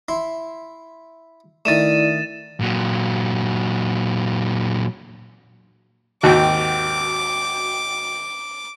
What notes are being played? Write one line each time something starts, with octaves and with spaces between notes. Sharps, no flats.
E4 C6
D#3 A3 E4 D5 A6 D#7 E7
A#2 F#3
G#1 D#2 F#4 G5 D6